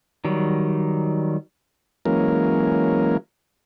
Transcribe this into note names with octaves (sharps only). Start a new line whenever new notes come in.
D#3 F#3 G3
E3 F#3 G#3 A#3 C#4 A#4